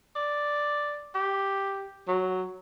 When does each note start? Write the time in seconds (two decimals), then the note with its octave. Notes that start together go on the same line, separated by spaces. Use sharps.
0.16 D5
1.15 G4
2.08 F#3